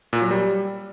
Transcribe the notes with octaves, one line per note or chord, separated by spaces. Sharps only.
A#2
F#3
G3